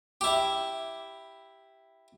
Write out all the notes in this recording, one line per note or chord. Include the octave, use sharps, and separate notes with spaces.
E4 G4